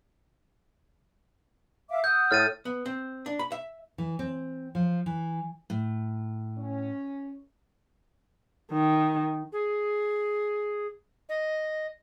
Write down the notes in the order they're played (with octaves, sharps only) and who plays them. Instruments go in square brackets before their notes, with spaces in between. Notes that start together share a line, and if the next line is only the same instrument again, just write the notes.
[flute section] E5 F5 D6
[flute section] F#5 D#6 E6 [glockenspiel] G6
[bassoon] A2 [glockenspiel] F6 A6 D#7
[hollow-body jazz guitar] B3
C4
D4
B5
E5
[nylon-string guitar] E3
C4
F3
E3
[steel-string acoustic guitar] A2
[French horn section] C#4
[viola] D#3
[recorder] G#4
D#5